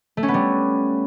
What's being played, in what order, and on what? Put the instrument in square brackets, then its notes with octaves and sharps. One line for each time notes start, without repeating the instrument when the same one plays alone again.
[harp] A3
C#4
B3
G3